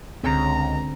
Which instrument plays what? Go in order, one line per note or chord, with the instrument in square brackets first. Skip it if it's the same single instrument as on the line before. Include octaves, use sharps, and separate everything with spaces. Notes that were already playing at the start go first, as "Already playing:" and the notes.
[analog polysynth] C#2 [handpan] D3 C4 [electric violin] A#5